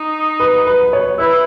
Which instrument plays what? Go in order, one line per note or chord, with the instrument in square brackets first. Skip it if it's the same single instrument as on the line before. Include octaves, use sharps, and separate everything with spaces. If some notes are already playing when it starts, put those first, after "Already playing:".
Already playing: [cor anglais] D#4
[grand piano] B4
B4
C#5
[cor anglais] E4 [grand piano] B4